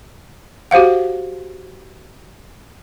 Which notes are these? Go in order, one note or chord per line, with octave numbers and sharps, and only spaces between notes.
F#4 G4 C5 F5 F#5